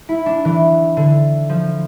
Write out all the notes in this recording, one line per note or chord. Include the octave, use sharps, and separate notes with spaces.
E4
D4
E3
D3
F3